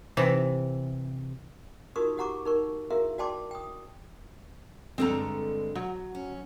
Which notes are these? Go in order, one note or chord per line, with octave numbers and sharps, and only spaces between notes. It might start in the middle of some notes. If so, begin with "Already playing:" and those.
C3 E3
D#4 F4 F#4 A#4 C#6 D#6
F#4 G4 F#5 A#5 C#6 D6
D#4 A#4 C#6
E4 F#4 G#4 A#4 E5 F5
F#4 D5 G5 A5 C6 D6
G5 D#6
G2 D3 G#3 C4 A4 A#5
F#3
C#4